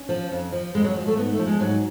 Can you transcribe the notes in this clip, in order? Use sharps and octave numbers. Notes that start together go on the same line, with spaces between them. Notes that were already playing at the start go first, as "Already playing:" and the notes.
Already playing: C#4
F3
F2
F3
F2 G#3
F#3
F3 G#3
A3
G#2 B3
A3
F3
G#3
G#2 F#3